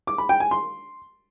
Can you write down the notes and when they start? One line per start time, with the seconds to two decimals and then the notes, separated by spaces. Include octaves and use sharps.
0.07 D6
0.18 B5
0.29 G5
0.40 G#5
0.51 C6